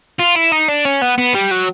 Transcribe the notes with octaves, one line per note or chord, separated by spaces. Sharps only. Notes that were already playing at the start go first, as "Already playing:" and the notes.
F4
E4
D#4
D4
C#4
B3
B3
G3
F#3